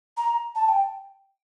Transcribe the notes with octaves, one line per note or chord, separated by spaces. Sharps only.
A#5
A5
G5